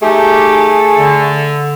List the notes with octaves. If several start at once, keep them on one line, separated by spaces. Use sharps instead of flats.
A3 D#4 G4 G#4
D3